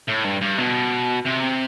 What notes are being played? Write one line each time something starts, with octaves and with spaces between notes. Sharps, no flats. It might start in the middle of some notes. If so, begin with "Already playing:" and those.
A2
G2
G2
B2
C3